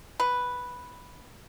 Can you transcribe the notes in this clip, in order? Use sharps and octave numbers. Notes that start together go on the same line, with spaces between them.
B4